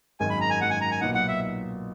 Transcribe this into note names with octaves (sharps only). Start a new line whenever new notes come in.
G#1 F#2 D#3 G#3 G#5
B5
A#5
G#5
G#1 F#2 D#3 G#3 F#5
G#5
A#5
G#5
B1 A#2 A#3 D#4 F#5
F#5
E5